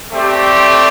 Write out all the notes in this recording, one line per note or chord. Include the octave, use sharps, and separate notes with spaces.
A3 C4 G4 D5